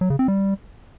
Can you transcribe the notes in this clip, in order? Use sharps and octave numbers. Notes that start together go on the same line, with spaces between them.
F#3
C#3
C4
G3